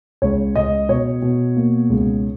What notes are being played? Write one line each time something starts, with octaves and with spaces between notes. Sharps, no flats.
C#2 C#5
C#2 D#5
B2 C#5
B2
A#3
C#2